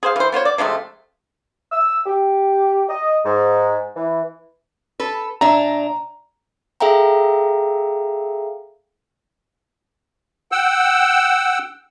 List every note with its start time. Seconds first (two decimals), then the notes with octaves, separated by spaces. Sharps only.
0.03 G#4 C5 F5
0.16 E3 C5
0.32 B3 F4 C5 C#5
0.45 D5
0.58 C3 F3 G#3 A3
1.72 E6
2.06 G4
2.89 D#5
3.24 G#2
3.96 E3
5.00 A4 B4
5.41 A#2 D4 E5 A#5
6.80 G#4 A4 E5 F5 G5 A#5
10.52 F#5 G5 E6